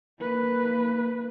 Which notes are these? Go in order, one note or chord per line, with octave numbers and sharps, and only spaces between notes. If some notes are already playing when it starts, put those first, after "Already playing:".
A#3 B4